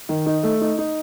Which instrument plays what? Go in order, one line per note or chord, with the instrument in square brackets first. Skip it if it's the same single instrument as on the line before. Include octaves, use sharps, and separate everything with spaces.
[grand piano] D#3
D#4
A3
D#4
D#4